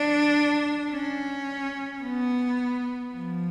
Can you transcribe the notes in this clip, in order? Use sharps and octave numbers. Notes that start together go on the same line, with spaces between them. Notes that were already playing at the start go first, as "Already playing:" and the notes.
Already playing: D4
C#4
B3
F3